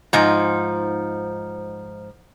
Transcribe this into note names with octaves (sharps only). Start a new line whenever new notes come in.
G#2 F3 D#4